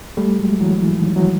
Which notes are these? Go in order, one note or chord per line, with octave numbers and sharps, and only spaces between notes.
G3 A3
F#3 G#3
E3 F#3
E3
D#3 F3
E3 F#3